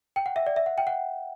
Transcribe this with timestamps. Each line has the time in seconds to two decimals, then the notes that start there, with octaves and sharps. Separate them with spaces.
0.16 G5
0.26 F#5
0.36 E5
0.46 D5
0.56 E5
0.66 F#5
0.78 G5
0.87 F#5